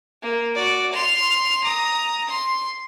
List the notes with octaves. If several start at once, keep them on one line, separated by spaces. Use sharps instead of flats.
A#3
F#4 D5
C6 F7
A#5 D#6
C6